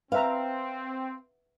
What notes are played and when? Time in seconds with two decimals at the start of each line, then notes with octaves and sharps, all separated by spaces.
0.12 C4 B4 E5 F5 A#5